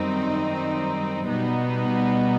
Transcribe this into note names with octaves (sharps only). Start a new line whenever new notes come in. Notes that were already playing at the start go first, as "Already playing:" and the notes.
Already playing: F#2 D#3 G3 C4 D#4
B2 G3 B3 D#4